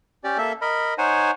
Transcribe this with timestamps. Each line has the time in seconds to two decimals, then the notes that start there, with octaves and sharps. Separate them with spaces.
0.24 C#4 G4 D5
0.38 A#3 A4 E5
0.61 A#4 D#5 B5
0.98 D#4 C5 C#5 F#5 G#5